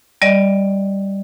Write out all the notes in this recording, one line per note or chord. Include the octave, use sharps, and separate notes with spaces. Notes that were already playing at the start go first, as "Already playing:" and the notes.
G3 D5 D#5